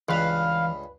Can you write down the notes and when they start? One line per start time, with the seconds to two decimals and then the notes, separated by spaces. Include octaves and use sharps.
0.09 C#2 G2 E3 B4 F5